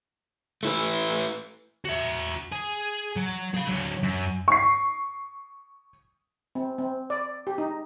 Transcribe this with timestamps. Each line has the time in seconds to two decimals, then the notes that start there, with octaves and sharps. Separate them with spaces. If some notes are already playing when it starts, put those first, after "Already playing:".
0.63 A3 E4 B4
1.85 F#4 E5
2.52 G#4
3.16 F#3
3.55 G#4 F5
3.69 D3 F#3
4.03 F#2
4.48 C#6 C7
6.55 C4
6.78 C4
7.10 D5
7.47 G4
7.58 D#4